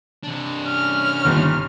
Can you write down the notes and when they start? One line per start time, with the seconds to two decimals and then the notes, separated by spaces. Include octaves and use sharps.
0.23 C3 D4
0.65 C#4 F6
1.25 G1 D#2